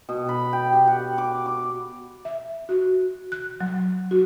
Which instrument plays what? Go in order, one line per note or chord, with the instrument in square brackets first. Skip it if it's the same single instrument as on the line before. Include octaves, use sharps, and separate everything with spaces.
[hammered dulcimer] B2
B5
G5
G4
F#5
D6
D6
[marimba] E5
F#4
F#6
F#3
F#4